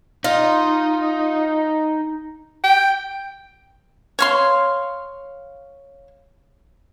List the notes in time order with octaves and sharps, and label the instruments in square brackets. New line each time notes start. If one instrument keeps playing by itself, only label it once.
[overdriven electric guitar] D#4 [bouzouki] F4
[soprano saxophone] G5
[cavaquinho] C#5 F5 C6